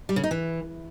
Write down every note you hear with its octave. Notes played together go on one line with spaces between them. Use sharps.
G3
C#3
D#4
E3